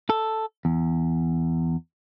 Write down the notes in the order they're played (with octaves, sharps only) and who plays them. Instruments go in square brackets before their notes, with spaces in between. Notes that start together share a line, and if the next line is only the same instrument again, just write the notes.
[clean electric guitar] A4
E2